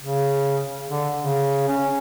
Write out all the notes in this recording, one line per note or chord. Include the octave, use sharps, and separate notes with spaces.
C#3
D3
C#3
C#4